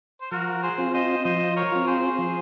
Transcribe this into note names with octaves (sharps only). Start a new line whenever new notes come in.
C5
F3 F#4 A#4
G#4 C5
C4 F4
C5 D#5
F3 C5 D#5
A#4 C#5
C4 F4
G#4 C5
F3